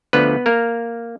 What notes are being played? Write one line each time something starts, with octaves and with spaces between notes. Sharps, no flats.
D2 D3 F3 B3 B4
A#3 A#4